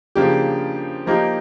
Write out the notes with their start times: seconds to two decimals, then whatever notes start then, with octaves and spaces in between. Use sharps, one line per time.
0.15 C#3 F3 A#3 D4 G4
1.06 F3 A#3 D#4 G4